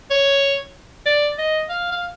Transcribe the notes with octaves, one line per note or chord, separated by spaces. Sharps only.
C#5
D5
D#5
F5
F5